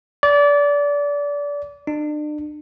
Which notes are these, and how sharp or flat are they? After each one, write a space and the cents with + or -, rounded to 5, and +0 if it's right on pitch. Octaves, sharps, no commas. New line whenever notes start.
D5 -25
D4 +40